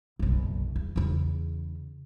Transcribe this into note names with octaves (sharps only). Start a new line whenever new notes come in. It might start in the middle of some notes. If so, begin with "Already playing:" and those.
F#1 B1
E2
E2 C#3